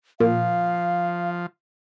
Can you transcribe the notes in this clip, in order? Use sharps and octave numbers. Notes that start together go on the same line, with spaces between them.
A#2 F3 F5